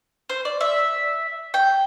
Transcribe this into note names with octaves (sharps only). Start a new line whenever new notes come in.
C5
D5
E5
G5